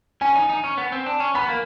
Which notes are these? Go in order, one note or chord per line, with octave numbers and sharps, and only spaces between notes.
C#4 G#5
D#4
D#4
C#4
B3
C4
D4
C#4
B3 B5
A#3